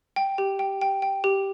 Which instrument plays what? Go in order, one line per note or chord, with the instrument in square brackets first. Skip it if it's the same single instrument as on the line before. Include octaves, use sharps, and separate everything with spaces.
[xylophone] G5
G4
G5
G5
G5
G4